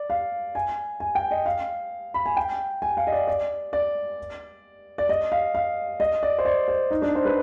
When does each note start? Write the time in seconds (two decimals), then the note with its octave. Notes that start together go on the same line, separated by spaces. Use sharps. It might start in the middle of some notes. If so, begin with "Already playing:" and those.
Already playing: D5
0.10 F5
0.55 G#5
1.00 G#5
1.15 G5
1.31 D#5
1.46 F5
2.14 B5
2.26 G#5
2.37 G5
2.82 G#5
2.97 F5
3.07 D#5
3.12 D5
3.27 D5
3.73 D5
4.98 D5
5.09 D#5
5.32 F5
5.55 F5
6.00 D#5
6.23 D5
6.38 C5
6.45 D5
6.68 C5
6.91 D#4
7.02 D4
7.15 C5
7.25 B4